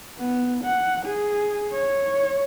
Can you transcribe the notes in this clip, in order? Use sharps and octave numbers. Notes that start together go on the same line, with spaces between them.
B3
F#5
G#4
C#5